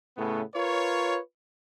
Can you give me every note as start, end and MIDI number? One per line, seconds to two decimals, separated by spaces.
0.17 0.43 45
0.17 0.43 49
0.17 0.43 57
0.17 0.43 59
0.55 1.19 65
0.55 1.19 70
0.55 1.19 71
0.55 1.19 73